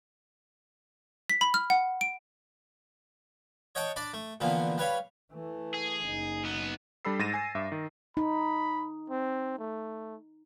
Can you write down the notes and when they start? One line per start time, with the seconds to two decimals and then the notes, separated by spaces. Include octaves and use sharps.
1.30 B6
1.41 B5
1.54 F6
1.70 F#5
2.01 D7
3.75 C#5 D#5 F#5 G5 A5
3.96 D4 D5 B5
4.14 A3
4.40 A#2 D3 E3 F3 B3
4.78 G3 B4 C#5 F5
5.33 E3 A3
5.74 G#4
6.06 F#1 D#4
6.44 B1 B3
7.05 G3 D4 A4 B5 E6 C7
7.19 G#2 A6 A#6 D#7 E7
7.34 G#5 C7
7.55 G2 E5 D6
7.72 D#3
8.17 D#4 B5
9.10 C4
9.59 A3